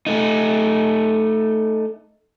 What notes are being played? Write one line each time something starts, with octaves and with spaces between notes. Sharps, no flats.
A3 D#4